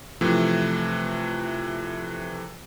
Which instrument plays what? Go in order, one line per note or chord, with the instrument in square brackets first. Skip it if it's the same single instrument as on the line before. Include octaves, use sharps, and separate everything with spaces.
[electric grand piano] C3 E3 F3 A3